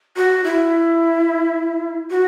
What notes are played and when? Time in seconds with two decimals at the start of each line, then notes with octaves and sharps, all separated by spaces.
0.16 F#4
0.44 E4
2.10 F#4